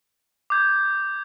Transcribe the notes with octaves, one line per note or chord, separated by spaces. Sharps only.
D6 G6 G#6